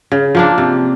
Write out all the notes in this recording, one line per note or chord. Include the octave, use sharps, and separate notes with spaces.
C#3
F3 A#3 D4
C3